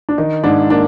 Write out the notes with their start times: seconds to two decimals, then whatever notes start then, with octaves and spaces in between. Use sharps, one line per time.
0.09 D4
0.18 D#3 D#4
0.44 G#2 D4
0.70 A#3 D4